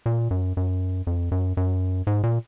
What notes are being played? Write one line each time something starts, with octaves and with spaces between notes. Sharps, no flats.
A#2
F#2
F#2
F2
F#2
F#2
G#2
A#2